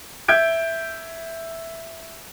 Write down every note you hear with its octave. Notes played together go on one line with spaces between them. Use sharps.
E5 G6 G#6 D7